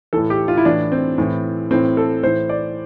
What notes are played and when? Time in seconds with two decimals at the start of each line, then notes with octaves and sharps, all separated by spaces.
0.13 A2 E3 A4
0.30 G4
0.48 F4
0.57 E4
0.65 A2 E3 D4
0.92 C4
1.18 A2 E3
1.70 A2 E3 C4
1.97 A4
2.23 A2 E3 C5
2.49 D5